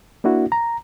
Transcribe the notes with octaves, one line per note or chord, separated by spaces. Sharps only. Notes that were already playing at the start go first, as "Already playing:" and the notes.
A#3 D4 E4 F#4
A#5